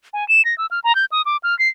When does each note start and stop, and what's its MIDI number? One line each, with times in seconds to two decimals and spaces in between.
0.13 0.27 80
0.29 0.44 100
0.45 0.57 94
0.58 0.66 88
0.71 0.80 89
0.84 0.95 82
0.95 1.05 91
1.12 1.22 87
1.26 1.37 86
1.43 1.57 89
1.59 1.68 96